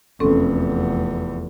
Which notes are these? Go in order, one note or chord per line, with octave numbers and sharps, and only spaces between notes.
F1 E2 C4 C#4 A4